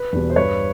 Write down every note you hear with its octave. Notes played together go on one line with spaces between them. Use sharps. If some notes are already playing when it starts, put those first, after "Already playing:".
Already playing: B4
E2 B2 G3
C5
G2 B4 C#5